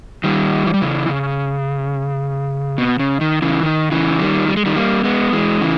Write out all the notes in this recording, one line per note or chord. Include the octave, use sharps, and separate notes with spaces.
D#3 G3
E3
G3
C#3 E3
C#3
B2
C#3
D#3
C#3 E3
D#3
C#3 E3
D#3 G3
G3
G#3
D#3 G3
G3 A#3
G#3 B3
E3 G#3
C#3 E3